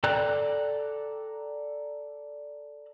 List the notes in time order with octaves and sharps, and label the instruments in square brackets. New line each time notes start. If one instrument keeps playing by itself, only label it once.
[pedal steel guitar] A4 D5 G5 A#5 F#6